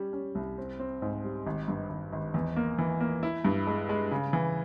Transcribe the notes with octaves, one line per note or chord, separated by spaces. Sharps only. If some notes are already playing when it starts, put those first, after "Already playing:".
Already playing: G3 C#4
C#4
C2
C4
C4
G#2
G3
G#1
G2
G#1
G#1
E2
A#3
E3
A#3
E4
G2
G#3
G#3
C#3
E3